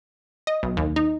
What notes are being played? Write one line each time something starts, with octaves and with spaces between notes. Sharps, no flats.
D#5
B1
D#2
D#4